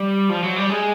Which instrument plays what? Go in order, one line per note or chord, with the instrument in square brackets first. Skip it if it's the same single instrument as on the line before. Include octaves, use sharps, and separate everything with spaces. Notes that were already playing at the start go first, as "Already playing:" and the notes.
Already playing: [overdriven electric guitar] G3
F3
F#3
G3
G#3